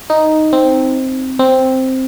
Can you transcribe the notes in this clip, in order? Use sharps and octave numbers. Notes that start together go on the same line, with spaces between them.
D#4
C4
C4